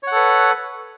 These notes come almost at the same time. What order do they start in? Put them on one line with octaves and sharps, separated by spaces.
C#5 F#5 A4 B4